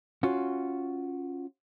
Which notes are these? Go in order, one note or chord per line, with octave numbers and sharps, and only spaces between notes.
C#4 F4 F#4